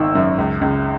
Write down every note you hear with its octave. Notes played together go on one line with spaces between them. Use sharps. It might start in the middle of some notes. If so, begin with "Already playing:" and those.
Already playing: G#1 D#3 E6
F#2
C#2
C#2